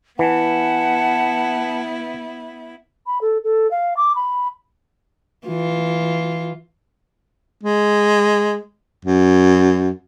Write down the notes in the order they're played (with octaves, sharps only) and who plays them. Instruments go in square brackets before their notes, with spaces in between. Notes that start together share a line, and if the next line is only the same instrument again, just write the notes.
[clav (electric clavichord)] E3 [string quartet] B3 E4 [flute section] F#5 A5
[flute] B5
A4
A4
F5
D6
B5
[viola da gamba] E3 F4
[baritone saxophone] G#3
F#2